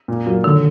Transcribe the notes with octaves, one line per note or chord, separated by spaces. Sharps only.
A#2
F#3 A#3 F4
D3 D#3